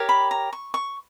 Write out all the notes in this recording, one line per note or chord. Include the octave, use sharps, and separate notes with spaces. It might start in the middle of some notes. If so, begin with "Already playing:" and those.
Already playing: G4 A#4 C#5
B5
A#5
C#6
C#6